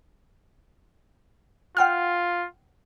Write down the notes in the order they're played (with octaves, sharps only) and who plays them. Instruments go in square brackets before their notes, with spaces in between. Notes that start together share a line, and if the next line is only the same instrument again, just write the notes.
[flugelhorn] F4 [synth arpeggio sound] F#5 G5 F6